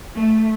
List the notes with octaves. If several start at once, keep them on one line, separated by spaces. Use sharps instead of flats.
A3